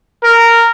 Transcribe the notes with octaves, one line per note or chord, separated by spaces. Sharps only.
A#4